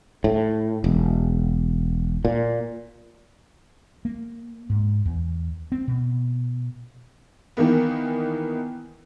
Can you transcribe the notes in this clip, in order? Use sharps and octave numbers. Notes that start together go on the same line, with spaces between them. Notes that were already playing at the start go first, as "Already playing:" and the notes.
A2
E1
A#2
A#3
G#2
E2
C4
B2
D#3 E3 A#3 B3